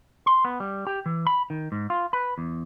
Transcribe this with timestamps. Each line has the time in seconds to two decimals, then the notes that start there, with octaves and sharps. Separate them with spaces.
0.26 C6
0.45 B3
0.60 G3
0.87 G4
1.06 E3
1.27 B5
1.50 D#3
1.72 G#2
1.90 F4
2.13 B4
2.38 E2